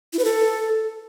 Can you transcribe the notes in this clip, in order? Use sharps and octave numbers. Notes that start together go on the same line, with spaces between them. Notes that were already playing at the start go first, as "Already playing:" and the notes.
E4
B4
A4